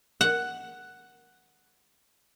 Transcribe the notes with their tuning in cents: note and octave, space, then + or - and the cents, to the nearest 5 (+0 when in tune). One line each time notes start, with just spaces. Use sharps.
F#5 +5